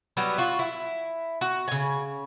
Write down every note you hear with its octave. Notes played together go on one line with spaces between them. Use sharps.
F#3 G3 B3
F4 F#4
E4
F#4
C#3 G#5